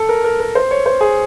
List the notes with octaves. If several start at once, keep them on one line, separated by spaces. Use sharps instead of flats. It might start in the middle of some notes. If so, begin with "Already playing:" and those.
Already playing: A4
A#4
A#4
A#4
C5
C#5
C5
G#4